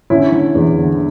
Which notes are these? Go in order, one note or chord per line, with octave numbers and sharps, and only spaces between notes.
D3 C#4 E4
D3
E2
D3